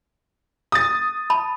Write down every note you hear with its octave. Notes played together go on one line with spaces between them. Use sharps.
D#6 A6
A5 B5